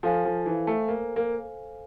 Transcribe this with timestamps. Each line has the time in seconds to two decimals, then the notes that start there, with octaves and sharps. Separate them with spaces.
0.03 F3 A4 C5 F5 G#5
0.25 F3
0.46 E3
0.67 A3
0.88 A#3
1.16 A#3